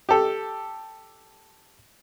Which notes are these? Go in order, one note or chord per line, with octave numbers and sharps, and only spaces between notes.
G4 A4